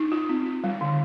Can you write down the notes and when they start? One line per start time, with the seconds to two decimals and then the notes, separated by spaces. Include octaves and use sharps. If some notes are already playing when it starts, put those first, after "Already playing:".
Already playing: D#4
0.12 F4
0.29 C4
0.46 F4
0.64 G3
0.81 D3